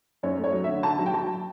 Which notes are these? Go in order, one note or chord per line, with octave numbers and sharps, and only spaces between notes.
F#2 C#5
A3
C#5
F#3
D3 E5
D3 A5
F#3
G5
F#3 A5